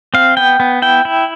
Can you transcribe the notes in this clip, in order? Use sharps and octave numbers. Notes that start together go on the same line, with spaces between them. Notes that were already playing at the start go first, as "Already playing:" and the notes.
C4 F5
B3 G5
B3
E4 G5
E4